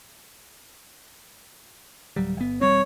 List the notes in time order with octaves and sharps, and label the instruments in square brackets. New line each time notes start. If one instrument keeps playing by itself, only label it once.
[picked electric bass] D1 F#3 G3
G1 B3
[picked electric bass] E1 G3 C4 [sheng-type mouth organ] C#5